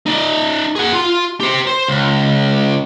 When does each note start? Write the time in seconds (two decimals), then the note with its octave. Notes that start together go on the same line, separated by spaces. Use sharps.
0.06 D#4 D5
0.76 G#4 F#5
0.93 F4 C6
1.40 G4 C5
1.67 C5
1.88 C#2